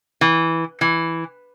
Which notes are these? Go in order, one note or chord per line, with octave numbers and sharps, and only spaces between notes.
E3
E3